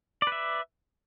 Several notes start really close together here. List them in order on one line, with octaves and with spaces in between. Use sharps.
D5 B4 E5